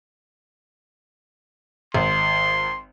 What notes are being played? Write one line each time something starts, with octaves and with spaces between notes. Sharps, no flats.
G#1 C6